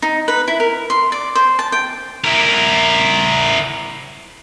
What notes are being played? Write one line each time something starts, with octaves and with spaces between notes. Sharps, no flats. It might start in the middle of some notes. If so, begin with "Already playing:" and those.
D#4
B4
E4
A#4
C6
D5
C5
A5
G5
E4 A#4